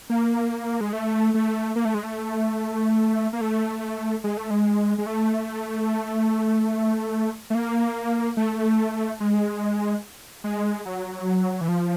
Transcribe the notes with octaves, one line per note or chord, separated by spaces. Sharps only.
A#3
G#3
A3
A3
A#3
A3
G#3
A3
A#3
A3
G#3
A3
G#3
G#3
A3
A3
A#3
A3
G#3
G#3
F#3
E3
F3